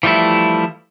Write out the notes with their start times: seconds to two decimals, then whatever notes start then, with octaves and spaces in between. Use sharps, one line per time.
0.03 E3 F3 G3 A3 E4